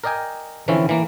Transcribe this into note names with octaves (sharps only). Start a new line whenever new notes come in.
A#4 D5 D#5 G5 G#5
D3 E3 F3 C4 C#4 E4
E3 A#3